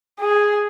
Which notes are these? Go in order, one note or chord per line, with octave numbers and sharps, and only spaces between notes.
G#4